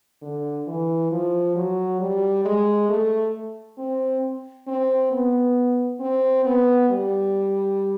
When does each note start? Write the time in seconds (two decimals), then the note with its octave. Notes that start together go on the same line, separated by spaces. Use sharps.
0.22 D3
0.68 E3
1.12 F3
1.56 F#3
2.00 G3
2.45 G#3
2.89 A3
3.78 C4
4.67 C4
5.12 B3
6.00 C4
6.45 B3
6.89 G3